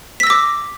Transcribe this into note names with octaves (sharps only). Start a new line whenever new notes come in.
D6 E6 A#6 B6